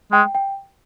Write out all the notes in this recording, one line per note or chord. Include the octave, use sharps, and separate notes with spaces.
G#3 G5
G5